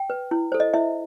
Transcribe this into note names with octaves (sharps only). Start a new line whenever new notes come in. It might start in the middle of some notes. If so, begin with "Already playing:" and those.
Already playing: G5
B4
E4
A4 C5
D#5
E4 E5